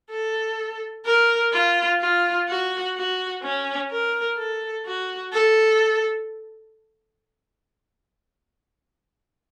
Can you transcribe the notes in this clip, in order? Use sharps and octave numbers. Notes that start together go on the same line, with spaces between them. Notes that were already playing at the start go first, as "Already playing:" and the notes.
A4
A#4
F4
F4
F#4
F#4
C#4
A#4
A4
F#4
A4